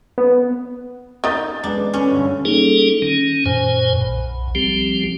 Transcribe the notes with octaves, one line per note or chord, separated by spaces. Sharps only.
B3
D#3 D#4 G6 A6 G7
G#3 B3 D4
C#4 D4 B4
G2 D3
G3 A#3 C#4 D#4 G#4 A4
D#3 C#4
F#2 A#2 C5 G#5
B1
F3 G3 C4 G4